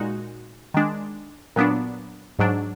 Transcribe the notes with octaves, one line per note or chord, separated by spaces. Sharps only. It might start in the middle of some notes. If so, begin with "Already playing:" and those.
Already playing: A#2 G#3 D#4 F#4
D#3 G#3 D4
A#2 F#3 B3 D4
G#2 F#3 D4